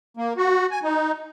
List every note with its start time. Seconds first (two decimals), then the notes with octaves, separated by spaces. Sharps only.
0.17 A#3
0.37 F#4
0.71 G#5
0.83 D#4